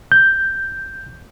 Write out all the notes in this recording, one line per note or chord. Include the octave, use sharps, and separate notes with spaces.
G6